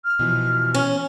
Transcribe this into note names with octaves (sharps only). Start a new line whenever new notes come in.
F6
B2 E3 F3
C#4